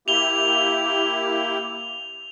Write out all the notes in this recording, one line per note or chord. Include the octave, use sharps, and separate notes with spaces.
A#3 E4 G4 F7 G7